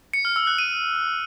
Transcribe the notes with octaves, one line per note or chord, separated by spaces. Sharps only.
C#7
F6
E6
F#6
D#7